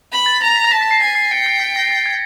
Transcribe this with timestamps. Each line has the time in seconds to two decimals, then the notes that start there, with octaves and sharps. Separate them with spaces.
0.12 B5
0.26 A6
0.41 A#5 A#6
0.56 B6
0.64 A#6
0.71 A5 B6
0.81 B6
0.91 C7
1.01 G#5 A#6
1.15 C7
1.31 G5 C#7
1.46 C7
1.60 B6
1.76 A#6
1.91 A6
2.06 G#6